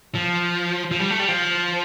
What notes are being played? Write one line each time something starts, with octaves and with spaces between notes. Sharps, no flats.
F3
F3
G3
A3
G3
F3